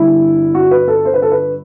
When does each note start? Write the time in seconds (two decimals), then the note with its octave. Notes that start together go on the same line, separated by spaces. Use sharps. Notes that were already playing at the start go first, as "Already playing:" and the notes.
Already playing: G1 G2 D3 E4
0.55 F#4
0.71 B4
0.88 A4
1.05 C5
1.14 B4
1.22 A4
1.32 B4